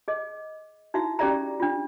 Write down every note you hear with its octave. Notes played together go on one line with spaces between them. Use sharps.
G#4 D#5
D#4 E4 F#4 E5
C#4 G4 G#4 D5 E5 A#5
D4 F4